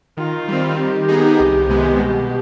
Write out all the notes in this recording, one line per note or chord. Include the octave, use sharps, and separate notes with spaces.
D#3 F4
G3 C4
D#3 G4
B3 D#4 G#4
C2
C3 D#3 G#3 B3
B2 G4